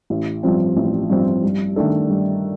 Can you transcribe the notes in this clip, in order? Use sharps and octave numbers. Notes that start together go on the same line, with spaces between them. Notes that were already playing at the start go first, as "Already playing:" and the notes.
A1
G2 F3 C4
A1
G2 F3 C4
G2
D#3 A3 D4 A4
G2